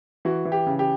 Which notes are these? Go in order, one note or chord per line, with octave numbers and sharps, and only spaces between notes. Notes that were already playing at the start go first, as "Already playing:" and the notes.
E3 F#4
E3
G4
C#3
G4